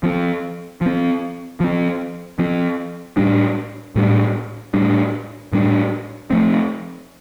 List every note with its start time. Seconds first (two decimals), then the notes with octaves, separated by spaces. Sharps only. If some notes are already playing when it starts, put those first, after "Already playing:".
0.03 F3 C4
0.81 F3 C4
1.60 F3 C4
2.39 F3 C4
3.17 A2 G3 D4
3.96 A2 G3 D4
4.74 A2 G3 D4
5.53 A2 G3 D4
6.31 F3 A3 C4